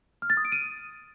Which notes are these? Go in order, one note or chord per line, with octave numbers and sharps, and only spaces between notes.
F6
A6
D#6
D7
D#7